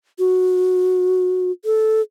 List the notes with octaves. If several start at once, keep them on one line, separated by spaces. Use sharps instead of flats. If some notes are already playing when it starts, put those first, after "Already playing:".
F#4
A4